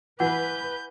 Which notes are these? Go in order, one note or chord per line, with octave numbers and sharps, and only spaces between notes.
E3 B4 F#5 G6